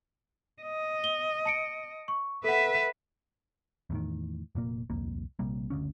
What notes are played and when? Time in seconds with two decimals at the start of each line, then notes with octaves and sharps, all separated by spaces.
0.62 D#5
1.04 G7
1.45 A5 C#7 D7
2.08 C#6
2.44 A4 B4 E5 F#5
3.90 E2 A2 D#3
4.55 F1 A#2 A#3
4.90 D#1 C2 F2 A#3
5.39 A#1 C3 G3 A#3
5.70 F#1 D2 D3 C#4